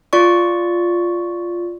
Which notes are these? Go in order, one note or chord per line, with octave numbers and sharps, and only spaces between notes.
F4 D5 C#6